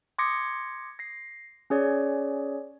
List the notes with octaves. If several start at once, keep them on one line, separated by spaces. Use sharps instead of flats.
C6 D6 D#6 G#6 A#6 C#7
A#6 C7
C#4 G#4 C#5 D5